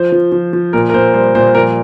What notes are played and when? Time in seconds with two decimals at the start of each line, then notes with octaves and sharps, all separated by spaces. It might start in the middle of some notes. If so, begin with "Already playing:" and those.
Already playing: F3 C5
0.12 F3
0.32 F3
0.53 F3
0.73 A#2 A#4
0.90 A#4
0.94 A#2 C5
1.14 G3 C5
1.35 A#2 C5
1.55 F3 A#4